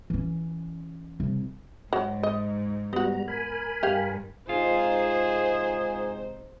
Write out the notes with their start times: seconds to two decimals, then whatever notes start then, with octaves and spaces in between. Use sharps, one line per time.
0.10 E3 C#4
1.20 C2
1.93 G#2 F#3
2.23 D#5
2.93 G3 B3 F#4 A#5
3.28 A#4 G#5 B5
3.83 G2 G4 F5
4.49 G#2 C3 D#4 F4 G#4 C5